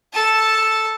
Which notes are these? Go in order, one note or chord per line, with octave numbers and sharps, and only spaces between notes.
A4 A5